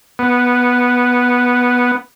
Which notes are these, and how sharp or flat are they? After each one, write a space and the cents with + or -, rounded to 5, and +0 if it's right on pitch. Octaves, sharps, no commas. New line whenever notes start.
B3 -5